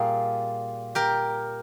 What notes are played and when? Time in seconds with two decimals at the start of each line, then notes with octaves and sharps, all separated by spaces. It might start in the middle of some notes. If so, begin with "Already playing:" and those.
Already playing: A#2 G3 A#3 G#4
0.95 G4 A#4